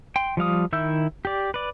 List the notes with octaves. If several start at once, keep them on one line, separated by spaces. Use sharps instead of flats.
G5 C6
F3 G3 F5 D#6
D#3 E4 E5 E6 G6
G4 D5
B4 D5